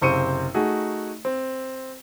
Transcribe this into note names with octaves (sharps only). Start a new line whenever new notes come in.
F#1 C3 C5 C#6 C#7 D#7
A3 D#4 F#4 G#4
C4